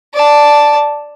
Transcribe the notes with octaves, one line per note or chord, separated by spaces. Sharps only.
D5 A5